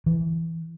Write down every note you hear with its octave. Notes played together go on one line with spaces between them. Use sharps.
E3